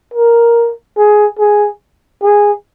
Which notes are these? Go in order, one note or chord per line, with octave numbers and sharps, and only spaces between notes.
A#4
G#4
G#4
G#4